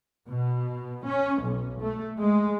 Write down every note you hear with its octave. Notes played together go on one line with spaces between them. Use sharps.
B2
C#4
B1
A3
G#3